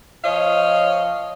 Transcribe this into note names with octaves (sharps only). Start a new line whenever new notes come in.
F3 C#5 D#5 F5